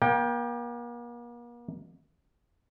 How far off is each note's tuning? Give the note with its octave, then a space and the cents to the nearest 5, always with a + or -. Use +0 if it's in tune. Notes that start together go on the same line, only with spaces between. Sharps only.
A#3 +40 G5 +15